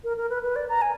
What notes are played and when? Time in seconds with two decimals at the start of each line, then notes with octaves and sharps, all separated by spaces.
0.04 A#4
0.17 A#4
0.30 B4
0.44 B4
0.56 D5
0.69 A#5
0.82 G#5